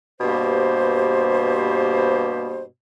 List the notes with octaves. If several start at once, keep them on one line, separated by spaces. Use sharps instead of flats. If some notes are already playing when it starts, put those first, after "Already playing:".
G2 B2 A#3 G4 C5